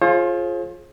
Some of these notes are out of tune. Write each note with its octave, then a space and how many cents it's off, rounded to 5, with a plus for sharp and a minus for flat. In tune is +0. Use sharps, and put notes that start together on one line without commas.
F4 +0 G#4 +30 C5 +40